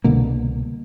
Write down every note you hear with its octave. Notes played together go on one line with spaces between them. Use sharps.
C2 B2 D3 A#3